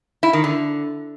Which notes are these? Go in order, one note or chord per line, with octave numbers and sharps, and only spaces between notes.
E4
D#3
D3